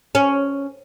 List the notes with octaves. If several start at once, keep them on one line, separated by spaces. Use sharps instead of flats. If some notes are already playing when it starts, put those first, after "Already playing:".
C#4